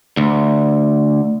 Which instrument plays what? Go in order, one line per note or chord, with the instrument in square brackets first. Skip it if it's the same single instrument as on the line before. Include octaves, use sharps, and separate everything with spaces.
[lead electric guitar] D2